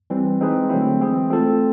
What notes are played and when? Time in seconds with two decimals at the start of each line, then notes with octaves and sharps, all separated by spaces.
0.10 E3 G3 C4
0.40 G#3 C4 D#4 G#4 B4
0.69 D3 F#3 A3 C4 E4
0.99 E3 G#3 C4 E4 G#4
1.29 A3 C4 F4 A4